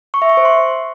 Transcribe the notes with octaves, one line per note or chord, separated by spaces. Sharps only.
C#6
E5
C#6
C5
C6